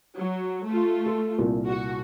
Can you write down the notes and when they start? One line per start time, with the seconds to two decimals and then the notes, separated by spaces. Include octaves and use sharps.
0.15 F#3
0.67 A3 F4
1.06 A4
1.39 C2 A#2
1.68 F#4